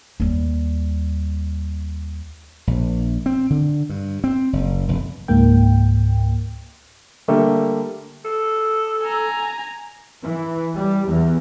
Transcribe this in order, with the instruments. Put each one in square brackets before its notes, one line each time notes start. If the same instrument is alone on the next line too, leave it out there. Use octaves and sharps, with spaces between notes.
[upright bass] D#2 G3
[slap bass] A#1
C4
D3
G2
C4
F#1
F1
[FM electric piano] C#2 G#2 A#3 G5
[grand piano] D3 G3 A3 A#3
[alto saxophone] A4
[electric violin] G#5 A#5
[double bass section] E3
G3
E2